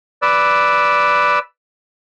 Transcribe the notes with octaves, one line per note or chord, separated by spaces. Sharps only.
B4 D5 E6